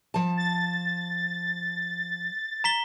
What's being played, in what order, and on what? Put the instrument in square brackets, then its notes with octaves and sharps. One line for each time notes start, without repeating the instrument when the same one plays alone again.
[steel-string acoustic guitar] F3 A5
[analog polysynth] A6
[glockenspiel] A#5 B6 G7